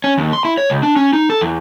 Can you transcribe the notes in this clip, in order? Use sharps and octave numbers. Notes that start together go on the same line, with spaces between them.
C#4
D#2
C6
E4
C#5
C#2
D4
C#4
D#4
A4
E2